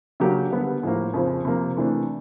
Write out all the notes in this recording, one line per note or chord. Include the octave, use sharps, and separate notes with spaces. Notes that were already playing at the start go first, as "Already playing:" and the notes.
C#3 F#3 A#3 D4 G4
D3 G3 B3
A2 F3 A#3
F2 C#3 F3
C3 F3 A#3
C3 E3 A3 D4